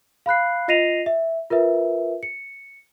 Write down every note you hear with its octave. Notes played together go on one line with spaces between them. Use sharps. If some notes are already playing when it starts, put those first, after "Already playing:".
F5 B5 F#6 C7
F4 D#5 A#6 C7 D#7 F7
E5
F4 A#4 B4 E5
C#7